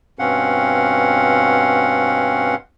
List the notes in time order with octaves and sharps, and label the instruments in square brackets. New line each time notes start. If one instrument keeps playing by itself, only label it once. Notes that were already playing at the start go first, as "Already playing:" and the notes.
[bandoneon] G2 B2 C4 C#4 F5 F#5